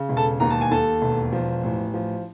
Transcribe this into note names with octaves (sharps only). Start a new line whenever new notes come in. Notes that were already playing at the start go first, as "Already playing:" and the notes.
Already playing: C#3
E1
A4 A5
D#2 A#5
A5
G#5
D#2 A4 A5
E1
F3
A1
F3